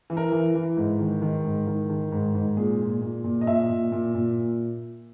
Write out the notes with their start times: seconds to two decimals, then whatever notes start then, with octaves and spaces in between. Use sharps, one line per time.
0.10 E3
0.17 A#4
0.32 E3
0.55 E3
0.77 G#2
0.99 D#3
1.22 D#3
1.44 G#2
1.67 D#3
1.90 D#3
2.12 G#2
2.35 G#2
2.57 A#2 G#4
2.80 A#2
3.01 A#2
3.24 A#2
3.41 D#5
3.47 A#2 E5
3.69 A#2
3.92 A#2
4.15 A#2